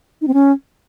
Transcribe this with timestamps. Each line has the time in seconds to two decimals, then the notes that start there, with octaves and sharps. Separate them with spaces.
0.21 D#4
0.28 C4
0.34 C#4